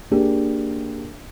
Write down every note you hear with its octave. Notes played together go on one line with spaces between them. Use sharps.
A#3 D4 G4 G#4